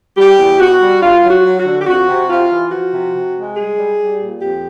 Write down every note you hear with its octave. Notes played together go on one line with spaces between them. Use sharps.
G3 G4
E2
B2 F#4
G3
G2 F4
F#3
F#4
F#3
F#4
D3
G4
F2 F#4
C3
C3 F4
E3
F3 F#4
C3
C3
G#3
G3 G#4
G3
G3
A#2
F2 G4